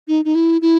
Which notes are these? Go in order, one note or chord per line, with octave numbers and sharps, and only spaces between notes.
D#4
D#4
E4
E4